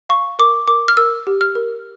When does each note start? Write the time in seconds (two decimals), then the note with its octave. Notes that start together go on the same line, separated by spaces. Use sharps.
0.09 F5 C#6
0.39 A#4 D6
0.68 A#4 D6
0.88 F6
0.97 A#4 E6
1.27 G4
1.41 F6
1.55 A#4